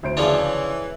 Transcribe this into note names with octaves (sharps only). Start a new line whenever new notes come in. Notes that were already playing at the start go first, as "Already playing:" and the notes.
D2 C5 D7
C#3 E3 F3 D4
C#5